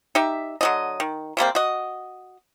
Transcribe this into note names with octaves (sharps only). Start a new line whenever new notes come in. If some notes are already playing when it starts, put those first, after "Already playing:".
D#4 G4 E5
D3 F#3 D#5
D#3
C3 G3 A#3 C4
F#4 D#5